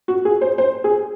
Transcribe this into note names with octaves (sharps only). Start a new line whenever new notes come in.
F#4
G#4
C5
C5
G#4